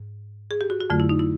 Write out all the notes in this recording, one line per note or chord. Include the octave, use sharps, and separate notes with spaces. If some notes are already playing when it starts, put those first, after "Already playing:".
Already playing: G#2
G#4
G4
F#4
F#4
F2 D3 F#3 A3 F4
E4
D#4
E4